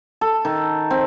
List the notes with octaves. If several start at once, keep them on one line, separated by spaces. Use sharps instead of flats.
A4
D#3
C4